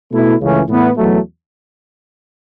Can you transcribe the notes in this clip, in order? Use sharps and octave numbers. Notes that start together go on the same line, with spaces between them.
B2 A3 E4
C#2 C#3 E3 A3 C#4
A2 E3 B3 E4
E2 B2 F#3 A3